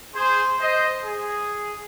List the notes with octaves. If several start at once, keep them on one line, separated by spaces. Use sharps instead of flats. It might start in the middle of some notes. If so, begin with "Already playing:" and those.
G#4 C5
C5 D#5
G#4